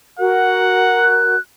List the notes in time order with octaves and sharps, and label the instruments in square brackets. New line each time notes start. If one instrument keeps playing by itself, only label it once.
[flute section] F#4 A#4 [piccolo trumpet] F#5
[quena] F#6